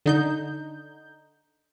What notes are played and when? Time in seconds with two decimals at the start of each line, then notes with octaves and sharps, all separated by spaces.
0.06 D3 D#4 G6